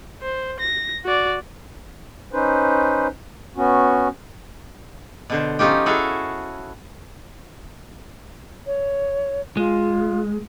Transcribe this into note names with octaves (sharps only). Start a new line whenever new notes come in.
C5
A#6
F#4 D5
C#4 D#4 B4 C5
B3 C#4 F#4
B2 D3 C5
F3 C#4 D#4 F4 G4
E4 F#4 G#4 A4 E5 F5
C#5
G#3 F4